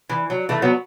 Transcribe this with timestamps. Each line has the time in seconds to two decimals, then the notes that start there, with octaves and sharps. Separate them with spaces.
0.09 E3
0.30 F#3
0.49 E3 A3
0.62 F#3 B3